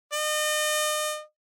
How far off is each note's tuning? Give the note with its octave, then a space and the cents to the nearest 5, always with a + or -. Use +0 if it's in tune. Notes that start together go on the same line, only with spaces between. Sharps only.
D#5 -40